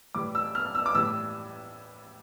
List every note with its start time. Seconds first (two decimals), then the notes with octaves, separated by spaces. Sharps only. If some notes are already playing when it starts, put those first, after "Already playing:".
0.15 A2 E3 G3 D6
0.35 E6
0.55 F6
0.75 E6
0.86 D6
0.94 A2 E3 G3 E6